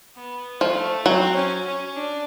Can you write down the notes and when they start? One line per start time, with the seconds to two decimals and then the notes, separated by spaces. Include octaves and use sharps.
0.17 B3
0.61 F3 A3
1.06 F#3 C4
1.35 C#4
1.66 C#4
1.96 D4